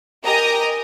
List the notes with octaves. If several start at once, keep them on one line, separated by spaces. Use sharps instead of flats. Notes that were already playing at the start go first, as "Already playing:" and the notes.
G4 A#4 D#5 G#5 A#5 D#6